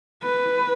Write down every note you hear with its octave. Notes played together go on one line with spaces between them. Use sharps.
B4